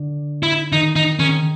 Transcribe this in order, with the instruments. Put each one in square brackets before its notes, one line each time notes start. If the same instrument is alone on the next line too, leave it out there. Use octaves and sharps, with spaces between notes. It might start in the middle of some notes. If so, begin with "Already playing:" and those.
Already playing: [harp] D3
[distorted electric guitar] E4
[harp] D#3 [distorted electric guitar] D#4
[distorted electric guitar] D#4
[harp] D#3 [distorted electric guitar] C#4